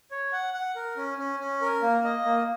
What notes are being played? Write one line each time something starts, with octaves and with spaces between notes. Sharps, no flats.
C#5
F#5
F#5
A#4
C#4
C#4
C#4
A#4
A#3
D#5
A#3